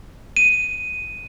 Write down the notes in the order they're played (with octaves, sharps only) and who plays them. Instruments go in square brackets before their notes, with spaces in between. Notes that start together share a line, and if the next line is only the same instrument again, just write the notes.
[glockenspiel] D#7